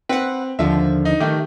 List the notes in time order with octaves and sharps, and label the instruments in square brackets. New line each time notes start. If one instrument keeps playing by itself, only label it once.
[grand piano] C4 [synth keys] B4 F#5
[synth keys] D#2 D3 F3 [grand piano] E5
[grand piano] D#4
[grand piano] D#3 A3 [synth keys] G4